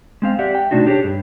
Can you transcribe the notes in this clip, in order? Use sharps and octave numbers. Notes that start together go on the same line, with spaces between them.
G#3 C4 F5
G4 D5 E5 F#5
G5
C3 A3 D4 D#4 F#4
D4 G4 G#4 C#5
G2